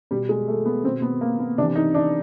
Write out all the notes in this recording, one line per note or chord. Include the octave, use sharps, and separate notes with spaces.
B2 G3
G#3
A3
B3
B2 C4
B3
A#3
B3
C3 E3 D4
D#4
D4